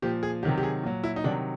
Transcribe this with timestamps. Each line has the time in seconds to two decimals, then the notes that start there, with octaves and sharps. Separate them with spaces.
0.02 A#2 F3 G4
0.23 G#4
0.43 C3 D#3 F#3 G4
0.57 G4
0.63 G#4
0.83 A#2 F#3
1.04 E4
1.16 D#4
1.24 C3 D#3 F#3 D4